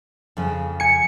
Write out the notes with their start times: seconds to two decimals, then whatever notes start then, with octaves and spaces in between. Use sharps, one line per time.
0.37 F2 C#3
0.80 G#5 C#7